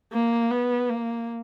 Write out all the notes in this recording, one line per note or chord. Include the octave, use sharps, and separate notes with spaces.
A#3
B3
A#3